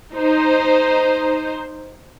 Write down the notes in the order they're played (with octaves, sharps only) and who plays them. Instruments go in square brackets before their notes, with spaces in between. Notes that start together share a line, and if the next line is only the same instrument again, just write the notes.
[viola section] D#4 C5